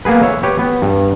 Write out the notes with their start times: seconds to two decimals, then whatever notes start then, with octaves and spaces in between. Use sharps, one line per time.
0.05 A#3 B3 G#4 B4
0.22 C#5 E5
0.43 G4 B4 C#5
0.59 B3
0.82 G2